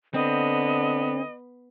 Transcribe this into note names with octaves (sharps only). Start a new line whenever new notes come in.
D3 B3 C4 D#5